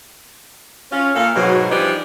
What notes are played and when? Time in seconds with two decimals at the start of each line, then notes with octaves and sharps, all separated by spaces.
0.91 C#4 F4
1.14 A#2 A4 F5
1.35 G#2 B2 F#3
1.70 E3 F3 G3 D4 D#4 G4